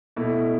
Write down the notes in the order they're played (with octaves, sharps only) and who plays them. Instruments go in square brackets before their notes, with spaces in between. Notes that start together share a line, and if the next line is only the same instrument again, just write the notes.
[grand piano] B2 A3 E4